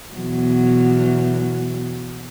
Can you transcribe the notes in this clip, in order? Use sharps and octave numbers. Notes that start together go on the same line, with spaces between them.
E2 B2 F#3